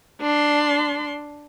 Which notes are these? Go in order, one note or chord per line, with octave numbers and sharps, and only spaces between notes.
D4 C6